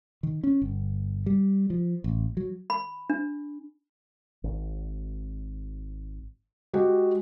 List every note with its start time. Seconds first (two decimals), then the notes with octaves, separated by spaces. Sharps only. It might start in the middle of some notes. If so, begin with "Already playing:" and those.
0.23 D#3
0.44 C#4
0.62 G1
1.26 G3
1.70 F3
2.04 A1
2.37 F#3
2.70 B5
3.10 D4
4.44 G#1
6.73 G#3 F#4 G4